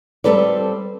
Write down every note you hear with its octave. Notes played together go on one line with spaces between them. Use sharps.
G3 C4 A4 B4 D5